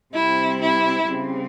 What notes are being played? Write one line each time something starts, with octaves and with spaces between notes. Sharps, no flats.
C3 G3 C4 E4
E4
C#3 G3 C4